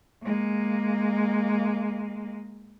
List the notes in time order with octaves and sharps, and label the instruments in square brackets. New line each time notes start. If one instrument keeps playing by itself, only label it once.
[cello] G#3 A#3